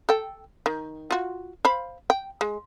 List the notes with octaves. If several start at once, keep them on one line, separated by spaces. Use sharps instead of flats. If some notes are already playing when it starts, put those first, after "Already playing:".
A4 G5
D#3
F4 F#4
C5 F5 B5
G5
G#3